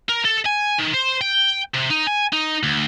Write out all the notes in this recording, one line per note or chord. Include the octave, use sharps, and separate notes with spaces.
A#4
A4
G#5
D#3
C5
G5
C3
D#4
G#5
D#4
D2